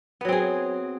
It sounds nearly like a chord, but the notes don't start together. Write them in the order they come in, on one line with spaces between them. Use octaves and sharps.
B3 F#3 C4 G#4